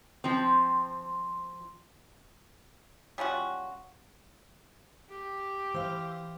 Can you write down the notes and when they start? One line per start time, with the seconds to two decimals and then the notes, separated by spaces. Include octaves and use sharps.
0.24 F3 C4
3.18 G3 C#4 F4 F#4
5.09 G4
5.74 E3 C5 F5